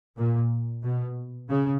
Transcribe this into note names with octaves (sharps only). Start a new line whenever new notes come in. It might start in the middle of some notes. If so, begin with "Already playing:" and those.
A#2
B2
C#3